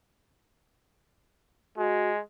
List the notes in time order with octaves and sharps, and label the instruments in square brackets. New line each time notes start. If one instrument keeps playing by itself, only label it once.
[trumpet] G#3 [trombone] F#4